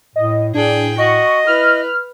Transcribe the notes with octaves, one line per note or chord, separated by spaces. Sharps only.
A2 D#5
A2 D4 G#4 G5
F#4 D#5 C#6
E4 B4 F6